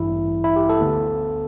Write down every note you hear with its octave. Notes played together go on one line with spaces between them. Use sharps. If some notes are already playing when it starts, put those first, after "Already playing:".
Already playing: A1 G2 E3 E4
E4
G4
A4
D2 D3 B3